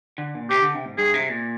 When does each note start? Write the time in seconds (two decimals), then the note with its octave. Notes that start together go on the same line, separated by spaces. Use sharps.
0.18 D3
0.35 A#2
0.50 C3 G4
0.62 D3
0.74 C3
0.85 G#2
0.98 G2 G#4
1.14 C3
1.29 A#2